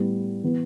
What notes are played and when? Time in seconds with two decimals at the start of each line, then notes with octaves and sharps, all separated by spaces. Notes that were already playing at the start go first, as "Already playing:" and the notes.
Already playing: A2 G3 B3
0.44 E3 B3